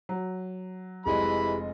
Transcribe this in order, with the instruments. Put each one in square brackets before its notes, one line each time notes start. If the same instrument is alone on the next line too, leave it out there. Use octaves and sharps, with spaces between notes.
[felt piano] F#3
[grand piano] F1 G#3 D#5 [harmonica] E3 B5 [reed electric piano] G4 G#4